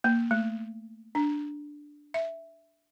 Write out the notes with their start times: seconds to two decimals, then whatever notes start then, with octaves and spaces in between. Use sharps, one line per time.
0.04 A#3
0.31 A3
1.15 D4
2.14 E5